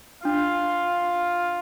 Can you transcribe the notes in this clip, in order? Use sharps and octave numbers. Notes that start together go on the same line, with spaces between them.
D4 F4